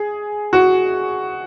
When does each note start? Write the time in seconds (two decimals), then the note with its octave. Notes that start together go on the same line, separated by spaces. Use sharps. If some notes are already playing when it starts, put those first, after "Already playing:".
Already playing: G#4
0.53 F#4